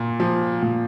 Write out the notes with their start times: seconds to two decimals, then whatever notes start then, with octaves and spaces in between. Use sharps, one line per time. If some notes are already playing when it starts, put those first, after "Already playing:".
Already playing: A#2
0.20 F3
0.62 A#2